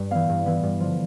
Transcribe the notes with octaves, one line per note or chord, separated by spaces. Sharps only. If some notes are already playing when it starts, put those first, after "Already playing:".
Already playing: G2
E3 B3 F5
G2
E3 B3
G2
D3 F3